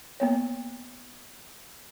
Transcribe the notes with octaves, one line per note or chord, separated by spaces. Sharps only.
A#3 B3 C#5